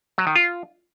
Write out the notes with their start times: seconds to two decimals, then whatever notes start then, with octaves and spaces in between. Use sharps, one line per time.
0.18 F#3
0.27 D#3
0.36 F4